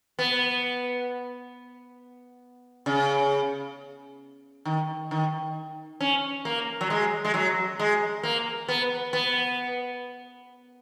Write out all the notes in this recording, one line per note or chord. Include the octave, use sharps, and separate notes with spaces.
B3
C#3
D#3
D#3
C#4
A#3
F#3
G#3
G#3
F#3
G#3
A#3
B3
B3